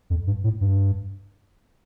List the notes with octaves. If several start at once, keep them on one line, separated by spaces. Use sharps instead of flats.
F2
G2
A2
G2